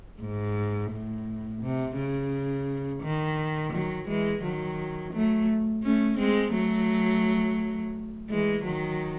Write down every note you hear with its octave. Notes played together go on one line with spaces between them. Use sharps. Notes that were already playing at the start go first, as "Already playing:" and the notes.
G#2
A2
C3
C#3
D#3
D#3 F#3
E3 G#3
D#3 F#3
F#3 A3
A3 C#4
G#3 C4
F#3 A3
E3 G#3
D#3 F#3